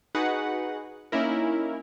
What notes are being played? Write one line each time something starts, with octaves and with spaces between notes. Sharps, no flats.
D#4 F#4 G#4 B4 F#5
A#3 C#4 D#4 E4 A#4